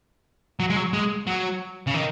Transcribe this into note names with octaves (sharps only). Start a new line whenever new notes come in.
F#3
G#3
F#3
G#3
F#3
C#3
D#3